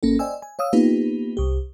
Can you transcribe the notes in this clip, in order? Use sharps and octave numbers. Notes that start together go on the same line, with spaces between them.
G#1 A#3 C#4 A4
C5 D5 D#5 G5 G#5 E6
G#5
C#5 F5 D#6 E6
A#3 B3 D#4 F4 G4 B4
C2 G4